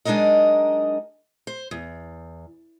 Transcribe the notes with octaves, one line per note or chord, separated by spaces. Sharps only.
F#3 G#3 D4 D#4 A#4 D#5
C5
E2